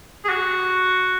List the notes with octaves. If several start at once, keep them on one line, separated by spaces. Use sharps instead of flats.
G#4
F#4